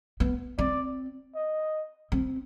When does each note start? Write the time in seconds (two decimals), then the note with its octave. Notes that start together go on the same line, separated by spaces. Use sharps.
0.20 B3
0.58 C4 D5
1.35 D#5
2.12 C4